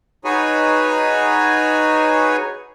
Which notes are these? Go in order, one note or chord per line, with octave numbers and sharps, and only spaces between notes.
D#4 F#4 G#4 B4 C#5 G#5